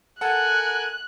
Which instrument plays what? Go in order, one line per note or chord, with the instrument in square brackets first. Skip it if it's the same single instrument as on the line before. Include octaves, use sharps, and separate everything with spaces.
[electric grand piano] A4 F#5 [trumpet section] A#4 G#5 [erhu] F#6